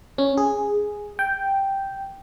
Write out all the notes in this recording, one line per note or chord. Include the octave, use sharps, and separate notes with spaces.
C#4
G#4
G5